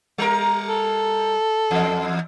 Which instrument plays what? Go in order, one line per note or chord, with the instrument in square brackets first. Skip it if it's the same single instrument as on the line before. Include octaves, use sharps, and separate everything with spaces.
[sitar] G3 A#4
[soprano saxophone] A4
[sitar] E2